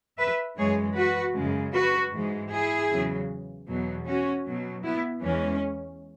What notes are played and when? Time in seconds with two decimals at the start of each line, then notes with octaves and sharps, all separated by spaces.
0.18 B4 E5
0.57 F#2 E3 G#3 G#4 C#5
0.95 F#4 B4
1.35 F#2 C#3 G#3
1.73 F#4 B4
2.13 G#2 E3 G#3
2.51 E4 G#4
2.90 E2 C#3 F#3
3.68 E2 B2 F#3
4.06 C#4 F#4
4.45 B2 F#3
4.84 B3 E4
5.22 E2 E3 G#3 C#4